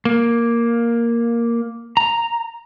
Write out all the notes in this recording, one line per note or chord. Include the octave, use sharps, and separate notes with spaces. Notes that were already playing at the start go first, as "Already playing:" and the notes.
A#3
A#5